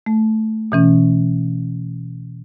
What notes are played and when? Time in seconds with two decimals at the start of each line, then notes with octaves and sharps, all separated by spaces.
0.06 A3
0.72 B2 E3 C#4